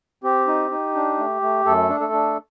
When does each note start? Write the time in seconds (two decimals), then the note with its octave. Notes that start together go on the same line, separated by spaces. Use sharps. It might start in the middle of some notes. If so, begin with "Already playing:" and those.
0.24 C4 G4
0.47 D#4
0.71 D#4
0.95 D4
1.18 A3
1.42 A3
1.65 F#2 A3 A4
1.89 D4
2.00 A3 A4
2.13 D4